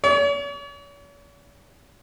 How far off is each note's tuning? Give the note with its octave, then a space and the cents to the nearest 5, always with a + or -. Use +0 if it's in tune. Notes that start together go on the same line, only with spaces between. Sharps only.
C#5 +45